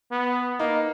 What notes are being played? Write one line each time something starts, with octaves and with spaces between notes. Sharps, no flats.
B3
A#3 D#4